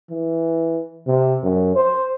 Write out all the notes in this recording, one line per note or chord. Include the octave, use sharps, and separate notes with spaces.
E3
C3
F#2
C5